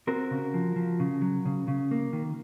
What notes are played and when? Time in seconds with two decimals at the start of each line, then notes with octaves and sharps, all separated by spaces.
0.07 C4 F#4 A#4
0.31 C#3
0.54 F3
0.76 F3
1.00 C#3
1.22 F#3
1.45 C#3
1.68 C#3
1.91 A#3
2.13 D#3